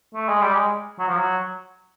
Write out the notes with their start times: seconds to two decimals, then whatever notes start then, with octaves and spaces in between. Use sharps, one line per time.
0.15 A3
0.29 G#3
0.42 G3
0.54 G#3
0.99 F#3
1.08 F3
1.16 F#3